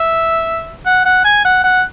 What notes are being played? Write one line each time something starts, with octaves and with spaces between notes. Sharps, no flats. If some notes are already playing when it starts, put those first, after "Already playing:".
Already playing: E5
F#5
F#5
G#5
F#5
F#5